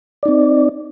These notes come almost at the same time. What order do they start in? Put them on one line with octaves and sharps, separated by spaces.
D5 D#4 C4